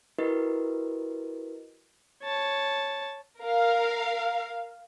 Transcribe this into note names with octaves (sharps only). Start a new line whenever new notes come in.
E4 F#4 G4 A#4 B4 D#5
C#5 A5
A#4 F5